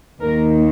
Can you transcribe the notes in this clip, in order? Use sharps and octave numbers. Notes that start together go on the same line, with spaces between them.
D#2 D#3 A#3 A#4